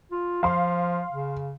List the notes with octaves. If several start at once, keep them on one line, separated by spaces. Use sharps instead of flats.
F4
F3 F5 C6
C#3